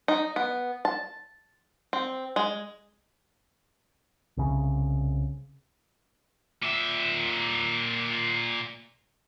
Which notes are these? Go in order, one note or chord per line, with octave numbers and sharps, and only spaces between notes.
D#4
B3
A5
C4
G#3
C2 C#3
A#2 E5